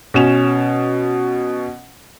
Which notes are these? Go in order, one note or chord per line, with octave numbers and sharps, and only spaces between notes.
B2 C#4 E7 F7